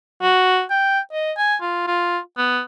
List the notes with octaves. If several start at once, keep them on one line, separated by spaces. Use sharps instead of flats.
F#4
G5
D#5
G#5
F4
F4
B3